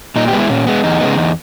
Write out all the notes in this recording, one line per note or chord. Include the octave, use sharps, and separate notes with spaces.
A#2 D#4
G4
G#3 B3
E4
A#2 C#4
G#3 B3
E2 D#4
C#3 G#3 B3
E2